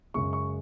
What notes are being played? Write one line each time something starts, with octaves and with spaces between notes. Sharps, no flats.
F#2 C#3 G#3 C#6
C#6